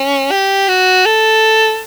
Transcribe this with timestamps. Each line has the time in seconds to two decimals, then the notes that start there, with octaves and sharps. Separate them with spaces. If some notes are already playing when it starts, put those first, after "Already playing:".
Already playing: C#4
0.31 G4
0.68 F#4
1.06 A4